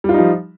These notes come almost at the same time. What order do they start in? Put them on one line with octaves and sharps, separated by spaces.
G3 F4 D#4 F3